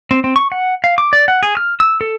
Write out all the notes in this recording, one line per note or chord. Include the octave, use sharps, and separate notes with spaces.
C4
C4
C#6
F#5
F5
D6
D5
F#5
G#4
F6
E6
A4